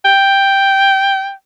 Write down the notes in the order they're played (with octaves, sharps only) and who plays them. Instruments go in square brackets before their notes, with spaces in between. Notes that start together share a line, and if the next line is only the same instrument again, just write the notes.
[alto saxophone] G5